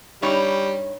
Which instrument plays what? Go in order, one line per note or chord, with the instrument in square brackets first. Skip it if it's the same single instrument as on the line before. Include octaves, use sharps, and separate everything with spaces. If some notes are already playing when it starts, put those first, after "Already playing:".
[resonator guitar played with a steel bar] G2 D#4 C#5 [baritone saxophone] G3